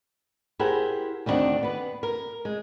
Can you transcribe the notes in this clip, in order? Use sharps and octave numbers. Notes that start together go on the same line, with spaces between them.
E4 G4 G#4 A#4 C5 F#5
D2 D#3 E3 C4 D4 F#5
B3 B4
A#4
G#3